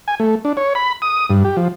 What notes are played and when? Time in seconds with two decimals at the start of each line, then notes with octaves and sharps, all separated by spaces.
0.08 G#5
0.20 A3
0.45 D4
0.57 C#5
0.75 B5
1.02 D#6
1.30 G2
1.44 G4
1.57 F3